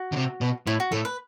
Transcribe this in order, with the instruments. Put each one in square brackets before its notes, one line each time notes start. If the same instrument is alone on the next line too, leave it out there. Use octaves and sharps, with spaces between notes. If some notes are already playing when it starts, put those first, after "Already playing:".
Already playing: [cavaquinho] F#4
[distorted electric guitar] D3
C3
B2
[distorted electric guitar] A2 [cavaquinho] E4
[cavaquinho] F#4
[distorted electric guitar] A2 [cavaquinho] A4
[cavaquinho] B4